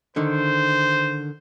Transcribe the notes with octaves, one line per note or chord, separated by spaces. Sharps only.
D3 D#3 C5